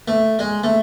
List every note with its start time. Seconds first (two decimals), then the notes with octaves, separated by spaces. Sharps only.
0.08 A3
0.39 G#3
0.64 A3